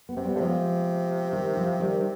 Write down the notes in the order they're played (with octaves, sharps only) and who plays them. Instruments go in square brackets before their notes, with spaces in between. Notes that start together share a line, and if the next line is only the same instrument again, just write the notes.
[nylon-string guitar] B3
[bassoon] C3 [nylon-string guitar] C4
[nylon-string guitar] G3 B3
[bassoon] D3
[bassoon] C3 [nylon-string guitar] F3 G#3
[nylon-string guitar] D#3 G3
F3
D#3 G3